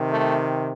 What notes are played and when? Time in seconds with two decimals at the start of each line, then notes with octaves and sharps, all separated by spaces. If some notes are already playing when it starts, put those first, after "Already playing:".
Already playing: C3 D#3
0.11 A3